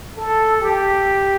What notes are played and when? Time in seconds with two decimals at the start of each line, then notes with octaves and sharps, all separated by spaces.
0.17 A4
0.60 G4